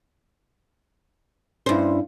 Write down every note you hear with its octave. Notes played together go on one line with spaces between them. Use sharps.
G2 C#4 E4 C5